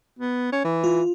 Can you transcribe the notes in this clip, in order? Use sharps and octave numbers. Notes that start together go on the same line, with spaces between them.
B3
C#4
E3
F4